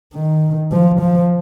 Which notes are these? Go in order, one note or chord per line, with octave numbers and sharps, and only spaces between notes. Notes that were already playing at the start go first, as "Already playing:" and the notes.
D#3
F3
F3